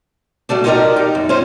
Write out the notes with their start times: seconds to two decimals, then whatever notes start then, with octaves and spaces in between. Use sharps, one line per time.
0.49 F#3 G3 A3 D4
0.64 D#4 F4 G4 A#4 D5 D#5
0.96 D#4
1.15 F#2
1.29 C#4 F4 C5